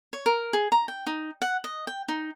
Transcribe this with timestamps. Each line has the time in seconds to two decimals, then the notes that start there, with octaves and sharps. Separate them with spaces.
0.13 C#5
0.26 A#4
0.53 G#4
0.72 A#5
0.88 G5
1.07 D#4
1.42 F#5
1.64 D#5
1.87 G5
2.08 D#4